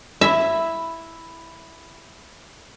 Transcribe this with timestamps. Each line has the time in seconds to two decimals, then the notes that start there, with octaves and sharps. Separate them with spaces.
0.21 E4 E5